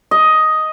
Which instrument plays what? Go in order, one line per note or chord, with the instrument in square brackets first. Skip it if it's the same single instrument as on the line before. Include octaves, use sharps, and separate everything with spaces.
[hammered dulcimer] D#5